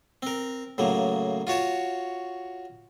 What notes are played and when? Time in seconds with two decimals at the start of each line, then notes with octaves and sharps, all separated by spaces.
0.23 C4 A#4
0.78 A2 C#3 F#3 A#3
1.47 F4 F#4 C#5 A5